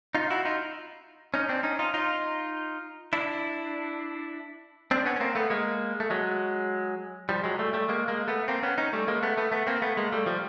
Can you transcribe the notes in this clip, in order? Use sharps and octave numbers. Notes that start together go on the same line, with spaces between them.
D#4 F4
E4 F#4
D#4 F4
C#4 D#4
C4 D4
C#4 D#4
D#4 F4
D#4 F4
D4 E4
C4 D4
B3 C#4
C#4
A#3 C4
A3 B3
G#3 A#3
A3
F#3 G#3
F3 G3
F#3 G#3
G3 A3
G3 A3
G#3 A#3
G#3 A#3
A3 B3
A#3 C4
B3 C#4
C#4 D#4
G3 A3
G#3 A#3
A3 B3
A3 B3
A3 B3
A#3 C4
A3 B3
G#3 A#3
G3 A3
F3 G3